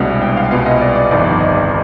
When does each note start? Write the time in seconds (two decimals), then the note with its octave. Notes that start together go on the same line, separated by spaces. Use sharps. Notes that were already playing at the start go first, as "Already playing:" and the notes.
Already playing: C2 B2 G#3 B3 D4
0.22 G5
0.37 F5
0.51 C2 B2 B3 F4 F5
0.66 D#5
0.81 D5
0.96 D5
1.11 G1 F2 D#3 D5
1.40 D#5